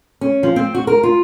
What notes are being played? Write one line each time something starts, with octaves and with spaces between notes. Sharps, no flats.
C#4
F3
C4
F#4
A#4
F4